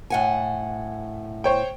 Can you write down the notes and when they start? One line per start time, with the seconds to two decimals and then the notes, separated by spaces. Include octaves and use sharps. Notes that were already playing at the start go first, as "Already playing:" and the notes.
0.10 A2 F#5 G#5
1.44 C5 C#5 G5